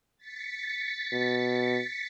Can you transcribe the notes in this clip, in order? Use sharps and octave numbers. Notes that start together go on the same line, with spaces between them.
A6 B6 C#7
B2